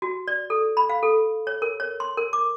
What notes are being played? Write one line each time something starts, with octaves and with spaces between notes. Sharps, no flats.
F#4
D5
A4
B5
F5
A4
C#5
A#4
C#5
C6
A#4
D6